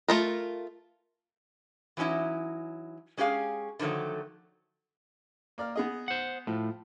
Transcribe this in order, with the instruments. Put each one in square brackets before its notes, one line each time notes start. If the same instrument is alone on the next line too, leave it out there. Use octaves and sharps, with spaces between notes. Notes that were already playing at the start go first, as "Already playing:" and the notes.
[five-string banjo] A3 F4 A#4
[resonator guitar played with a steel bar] E3 F#3 C#4 D#4 E4
G#3 C#4 G4 G#4 F5
D3 D#3 F3 F#3 A3
[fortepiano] A#3 D5 F6
B3 G#4 D#5
[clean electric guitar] C5 F#5
[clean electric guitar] A2 [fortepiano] F3